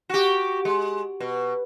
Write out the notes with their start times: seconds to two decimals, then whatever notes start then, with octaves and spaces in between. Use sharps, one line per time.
0.10 F#4 G4
0.65 G#3
1.20 B2